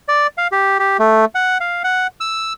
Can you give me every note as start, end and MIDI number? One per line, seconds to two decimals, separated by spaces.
0.08 0.27 74
0.38 0.47 77
0.52 0.78 67
0.79 0.97 67
0.99 1.25 57
1.35 1.58 78
1.60 1.82 77
1.84 2.07 78
2.20 2.53 88